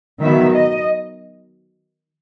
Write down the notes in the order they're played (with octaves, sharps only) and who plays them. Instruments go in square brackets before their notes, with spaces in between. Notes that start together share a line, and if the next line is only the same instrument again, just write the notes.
[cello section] D#3 F#3 B3 E5
D#5